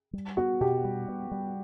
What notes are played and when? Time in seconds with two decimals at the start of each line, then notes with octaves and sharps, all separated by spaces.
0.13 G3
0.37 B3 F#4
0.61 B2 G4
0.84 G3
1.08 B3
1.32 G3